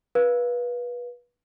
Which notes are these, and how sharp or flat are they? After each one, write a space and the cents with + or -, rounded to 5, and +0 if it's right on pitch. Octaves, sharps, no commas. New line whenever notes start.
B4 -25 F5 +0